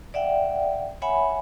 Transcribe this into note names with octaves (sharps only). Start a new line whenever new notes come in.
D5 E5 F#5 G5
C#5 E5 F#5 G#5 B5